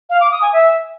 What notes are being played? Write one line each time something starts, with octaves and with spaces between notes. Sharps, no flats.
F5
D6
D#6
G#5
E5